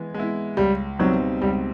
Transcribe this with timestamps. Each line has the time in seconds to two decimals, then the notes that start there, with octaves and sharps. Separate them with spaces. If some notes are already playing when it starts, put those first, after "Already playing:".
Already playing: E3 G#3 B3
0.14 G#3 B3 E4
0.57 C#2 G3
0.99 B2 F#3 G3 C4 D#4
1.42 C#2 G3